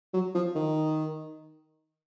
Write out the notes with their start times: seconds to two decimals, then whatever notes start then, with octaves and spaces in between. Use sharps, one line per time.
0.14 F#3
0.35 F3
0.55 D#3